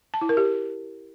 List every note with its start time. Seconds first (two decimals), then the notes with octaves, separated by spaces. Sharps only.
0.14 A5
0.21 E4
0.29 A#4
0.37 G4